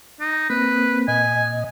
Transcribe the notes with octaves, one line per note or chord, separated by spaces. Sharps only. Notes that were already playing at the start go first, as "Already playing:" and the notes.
D#4
A#3 C4 B4
A#2 D#5 G#5